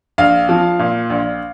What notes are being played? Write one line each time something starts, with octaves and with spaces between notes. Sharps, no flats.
A#1 F5
F3
A#2
A#1